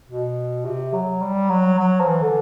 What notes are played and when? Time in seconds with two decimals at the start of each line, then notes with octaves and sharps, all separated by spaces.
0.09 B2
0.65 C3
0.93 F#3
1.22 G3
1.50 F#3
1.79 F#3
2.00 F3
2.06 E3
2.22 D3